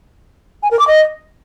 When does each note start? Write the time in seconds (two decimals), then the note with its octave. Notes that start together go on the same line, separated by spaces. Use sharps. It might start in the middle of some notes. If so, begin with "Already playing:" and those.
0.63 G#5
0.71 A#4
0.79 D6
0.88 D#5